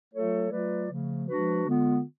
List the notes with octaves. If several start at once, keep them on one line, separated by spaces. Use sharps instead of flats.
F#3 A3 F4 A4 C#5
F#3 A3 F4 B4 D5
C#3 F3 A3
F3 G#3 D4 F#4 B4
D3 G#3 B3 F4